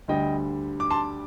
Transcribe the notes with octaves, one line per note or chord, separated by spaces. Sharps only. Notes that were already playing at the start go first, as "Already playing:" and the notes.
D2 D3 G3 D#5 G5
D6
A5 C6